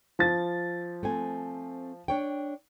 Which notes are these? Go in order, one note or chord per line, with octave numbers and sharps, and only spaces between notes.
F3 A6
A3 C4 G#5
D4 C#5 G5